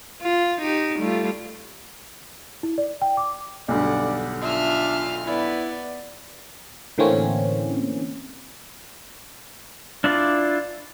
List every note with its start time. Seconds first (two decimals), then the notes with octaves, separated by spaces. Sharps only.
0.22 F4
0.62 D#4 G4
0.98 G3 A3 F4
2.63 E4
2.78 D5
3.02 G5
3.17 D6
3.68 B1 G2 D3 D5 F#5
4.43 D4 F4 E5 F6
5.27 B3 E4 D5
6.98 A2 D3 E3 A#3 C4 C#4
10.04 D4 E4 F4 D5